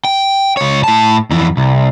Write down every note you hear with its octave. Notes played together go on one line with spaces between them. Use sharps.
G5
C#2 C#5
A2 A5
F2 E3
C2